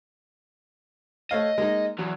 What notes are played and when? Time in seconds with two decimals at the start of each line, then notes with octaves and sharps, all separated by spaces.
1.31 A3 C#5 D#5 F5
1.58 G#3 A#3 D#4
1.98 E2 F#3